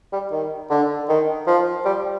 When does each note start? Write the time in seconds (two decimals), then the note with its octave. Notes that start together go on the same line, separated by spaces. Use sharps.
0.13 G3
0.32 D#3
0.70 D3
1.09 D#3
1.47 F3
1.85 G3